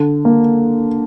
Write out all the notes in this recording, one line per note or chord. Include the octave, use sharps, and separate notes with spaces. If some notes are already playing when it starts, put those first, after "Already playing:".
Already playing: D3
A#3